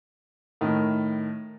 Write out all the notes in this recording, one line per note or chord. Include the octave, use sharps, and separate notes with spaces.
A2 D#3